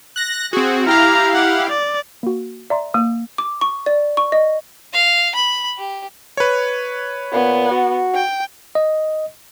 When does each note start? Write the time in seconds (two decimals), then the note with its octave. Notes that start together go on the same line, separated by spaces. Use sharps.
0.16 F#6 A#6
0.53 C4 F#4 G#4
0.86 E4 G4 F5 A#5 F6
1.34 F#5
1.69 D5
2.23 A#3 F#4
2.70 D5 E5 A#5 C6
2.94 A#3 D#6
3.38 D6
3.61 C#6
3.86 D5
4.17 C#6
4.32 D#5
4.93 F5
5.35 B5
5.78 G4
6.37 B4 C#5
7.33 A#2 B3
7.71 F#4
8.15 G5
8.75 D#5